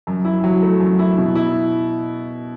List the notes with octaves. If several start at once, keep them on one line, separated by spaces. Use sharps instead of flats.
F#2
E4
F#3
A3
F#2
E4
B2
E4